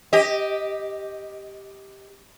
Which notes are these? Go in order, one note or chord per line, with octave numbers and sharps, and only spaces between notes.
G4 D#5